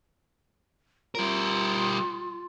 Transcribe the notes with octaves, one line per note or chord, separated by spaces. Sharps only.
G3 F4 A#4